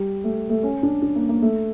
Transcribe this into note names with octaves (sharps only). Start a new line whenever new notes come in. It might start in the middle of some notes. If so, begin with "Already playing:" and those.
Already playing: G3
A3
A3
C#4
D4
D4
A#3
A#3
A3